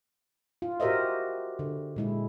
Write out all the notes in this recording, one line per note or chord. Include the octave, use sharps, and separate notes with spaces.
F4
F#4 G4 A#4 C5 D#5 E5
D3
A#2 G#3 E4